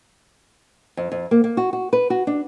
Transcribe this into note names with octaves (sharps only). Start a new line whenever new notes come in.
F2
F2
A#3
A#3
F#4
F#4
B4
F#4
D4